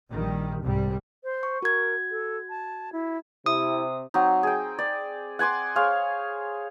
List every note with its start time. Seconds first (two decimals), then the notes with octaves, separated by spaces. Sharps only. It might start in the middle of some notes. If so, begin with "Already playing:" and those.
0.10 A#1 D#3 G3
0.62 C2 G#2 G3
1.24 C5
1.43 C#6
1.62 F#4 A#4 G#6
2.11 A4
2.49 A5
2.93 E4
3.46 C3 E4 D#6
4.14 F#3 C4 D#4
4.43 G#4 G5
4.79 D5
5.39 F#5 G#5 C6 D6
5.76 G#4 C5 C#5 F5